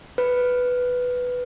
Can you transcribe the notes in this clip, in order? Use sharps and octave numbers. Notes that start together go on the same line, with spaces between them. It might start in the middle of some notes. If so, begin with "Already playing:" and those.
B4